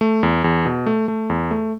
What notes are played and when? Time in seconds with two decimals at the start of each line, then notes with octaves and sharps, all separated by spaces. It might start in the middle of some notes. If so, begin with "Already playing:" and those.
0.01 A3
0.23 E2
0.44 E2
0.66 B2
0.86 A3
1.08 A3
1.30 E2
1.51 A3